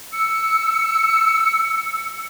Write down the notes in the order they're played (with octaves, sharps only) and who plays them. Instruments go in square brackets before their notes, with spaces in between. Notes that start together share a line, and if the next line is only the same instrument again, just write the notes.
[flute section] E6 [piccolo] C#7